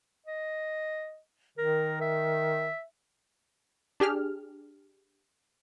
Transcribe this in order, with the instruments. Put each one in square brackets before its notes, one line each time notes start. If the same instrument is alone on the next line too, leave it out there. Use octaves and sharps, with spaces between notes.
[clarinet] D#5
[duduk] D#3 [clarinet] A#4
[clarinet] E5
[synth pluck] D4 G4 G#4 F6